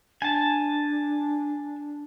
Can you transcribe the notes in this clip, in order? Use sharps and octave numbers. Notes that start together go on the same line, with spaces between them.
D4 G#5 A5